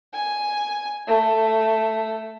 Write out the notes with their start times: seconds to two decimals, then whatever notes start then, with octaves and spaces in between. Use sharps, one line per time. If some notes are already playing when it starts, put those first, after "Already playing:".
0.14 G#5
1.07 A3